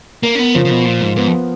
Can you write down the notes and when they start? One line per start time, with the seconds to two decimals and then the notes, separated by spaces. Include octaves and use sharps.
0.23 A#3 A#4
0.35 C#4
0.39 B3
0.54 C#3 F3
0.65 C#3
0.70 B2
0.85 A#2 F4
1.01 G#2
1.16 G#2 B3
1.27 F2